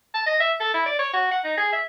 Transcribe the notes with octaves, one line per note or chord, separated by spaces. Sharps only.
A5
D#5
E5
A4
E4
D5
C#5
F#4
F#5
D#4
G#4
E5